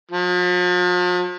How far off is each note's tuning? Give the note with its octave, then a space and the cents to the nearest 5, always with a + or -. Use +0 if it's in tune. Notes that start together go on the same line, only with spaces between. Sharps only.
F3 +45